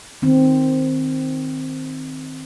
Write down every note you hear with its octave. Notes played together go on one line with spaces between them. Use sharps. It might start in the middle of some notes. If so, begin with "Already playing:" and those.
D#3 C4